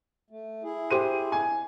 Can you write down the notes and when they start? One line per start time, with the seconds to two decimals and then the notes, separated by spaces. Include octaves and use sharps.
0.30 A3
0.63 E4 G#4
0.90 G4 C5 D#7
1.32 G#5